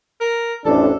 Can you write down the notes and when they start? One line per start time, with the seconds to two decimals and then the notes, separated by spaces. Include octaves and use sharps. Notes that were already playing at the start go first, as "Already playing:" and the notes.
0.21 A#4
0.65 A1 F2 D4 A4